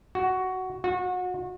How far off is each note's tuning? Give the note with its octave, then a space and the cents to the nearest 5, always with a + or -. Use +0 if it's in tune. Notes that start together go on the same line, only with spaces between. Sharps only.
F#4 +10
F#4 -30